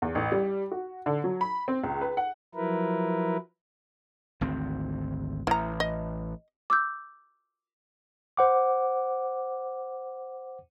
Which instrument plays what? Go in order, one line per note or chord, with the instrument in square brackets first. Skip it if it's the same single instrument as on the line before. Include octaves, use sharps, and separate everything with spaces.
[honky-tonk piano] E2
A1
G3
F#4
D3
F#3
B5
C4
C#2
B4
F#5
[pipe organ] F3 F#3 E4 A#4 B4
[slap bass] G#1 D2 C4
[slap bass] A1 [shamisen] E4 A#5
[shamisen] D#5
[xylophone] D6 E6 G6
[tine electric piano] C5 F#5 D6